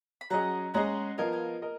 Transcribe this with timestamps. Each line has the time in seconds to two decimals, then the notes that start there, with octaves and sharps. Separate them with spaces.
0.21 B5
0.30 F#3 C#4 G#4 D#5 F#5 A#5
0.74 G#3 C#4 G#4 D#5 F#5 A#5
1.18 F3 B3 F4 A#4 D#5 F5 G#5
1.32 F5 G#5
1.62 A#4 D#5